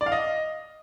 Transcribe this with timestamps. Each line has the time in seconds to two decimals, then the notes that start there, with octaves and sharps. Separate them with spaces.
0.01 D5
0.06 F5
0.12 D#5